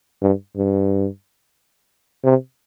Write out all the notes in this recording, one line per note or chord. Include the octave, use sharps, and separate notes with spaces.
G2
G2
C3